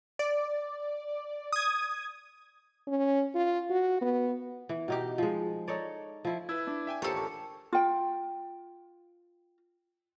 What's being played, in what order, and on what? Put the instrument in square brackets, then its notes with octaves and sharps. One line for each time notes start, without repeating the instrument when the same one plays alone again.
[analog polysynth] D5
D#6 G#6
[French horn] C#4
F4
F#4
B3
[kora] E3
B2 D#4 G4
F3 G#3
D#4 A4 C#5 D5
F3 E4
[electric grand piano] E4 B4 [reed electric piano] E6 G#6
[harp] D4
[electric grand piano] E5 G5 G#5
[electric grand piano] D#2 C5 [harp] F4 G4 A#4 [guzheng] A4 C#5
[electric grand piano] A1 C#6
[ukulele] F4 G5